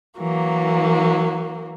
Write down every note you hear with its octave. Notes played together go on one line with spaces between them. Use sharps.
E3 F#3 A#3